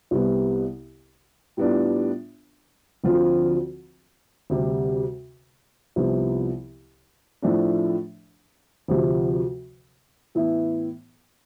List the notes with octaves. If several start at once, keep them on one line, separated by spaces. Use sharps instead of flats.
C2 C3 G3 B3
A2 G3 B3 D4 F4
D2 D3 F3 C4 F4
D2 C3 G3
C2 C3 F3 B3
A2 F3 A3 D4
D2 C3 F3
A2 E3 B3 E4